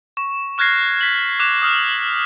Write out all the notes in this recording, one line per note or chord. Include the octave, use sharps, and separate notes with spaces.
C#6
C#6 F6 F#6 G#6 A#6 C7
B6 F#7
D6 F#6 E7
D#6 F6 E7